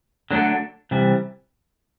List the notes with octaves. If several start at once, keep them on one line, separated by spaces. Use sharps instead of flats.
D3 F#3 A3 D4 A4
C3 E3 G3